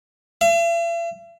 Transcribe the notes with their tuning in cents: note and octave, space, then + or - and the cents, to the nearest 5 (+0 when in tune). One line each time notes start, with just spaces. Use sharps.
E5 +45